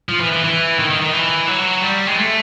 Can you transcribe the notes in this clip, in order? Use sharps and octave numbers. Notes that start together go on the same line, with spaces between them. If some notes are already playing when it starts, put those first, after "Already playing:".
F3
E3
E3
E3
D#3
D#3
D#3
E3
F#3
G3
G#3
A3